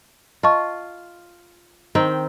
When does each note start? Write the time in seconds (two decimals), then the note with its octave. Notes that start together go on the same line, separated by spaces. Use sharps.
0.43 F4 D#5 A5 C#6
1.95 D#3 C4 G5